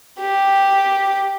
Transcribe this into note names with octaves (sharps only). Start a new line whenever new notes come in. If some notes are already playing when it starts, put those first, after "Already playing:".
G4